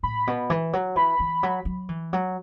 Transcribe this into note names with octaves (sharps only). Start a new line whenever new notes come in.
A2 B5
B2
E3
F#3
E3 B5
E3
F#3
F#3
E3
F#3